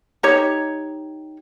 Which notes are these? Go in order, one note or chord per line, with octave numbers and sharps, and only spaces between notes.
D#4 G4 C#5